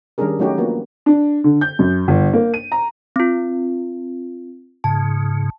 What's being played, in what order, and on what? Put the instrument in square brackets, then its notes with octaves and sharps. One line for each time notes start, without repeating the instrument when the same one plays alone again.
[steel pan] D#3 G3 C#4 D4 G#4 A#4
F#3 A3 C#4 D#4 F#4 G4
F3 A#3 B3 D4 F#4
[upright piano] D4
D3
G6
F#2
G1
A#3
D#7
A#5
[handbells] C4 F4
[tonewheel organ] G#2 C#3 [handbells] A5